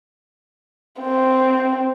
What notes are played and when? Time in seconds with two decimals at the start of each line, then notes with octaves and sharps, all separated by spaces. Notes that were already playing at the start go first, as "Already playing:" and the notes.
1.01 C4